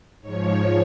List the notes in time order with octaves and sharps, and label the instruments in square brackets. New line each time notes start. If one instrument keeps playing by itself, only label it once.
[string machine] G#2 F3 C#5